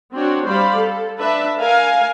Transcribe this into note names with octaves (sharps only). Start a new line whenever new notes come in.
C4 D4 F#4 C#5
G3 C5 D5 F5 B5
A4
D4 B4 E5 A5
A#4 F5 G#5